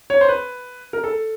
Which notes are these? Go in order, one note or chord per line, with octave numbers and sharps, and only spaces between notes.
C#5
C5
B4
A#4
A4